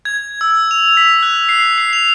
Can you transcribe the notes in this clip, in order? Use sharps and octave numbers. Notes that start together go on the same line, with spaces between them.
G#6
E6
F7
B6
F#6
C7
C7
F7